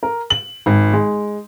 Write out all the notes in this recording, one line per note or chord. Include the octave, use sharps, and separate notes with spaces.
A#4
F#7
G#1
G#3